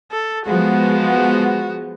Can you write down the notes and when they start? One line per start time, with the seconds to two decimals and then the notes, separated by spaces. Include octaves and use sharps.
0.12 A4
0.46 F3 G#3 B3 F#4